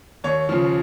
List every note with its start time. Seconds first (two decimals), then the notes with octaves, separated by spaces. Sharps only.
0.24 D#2 C#5
0.49 C#3 F3